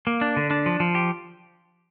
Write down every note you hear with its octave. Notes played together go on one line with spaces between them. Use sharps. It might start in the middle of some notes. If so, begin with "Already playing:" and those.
A#3
D4
D3
D4
F3
F3
G4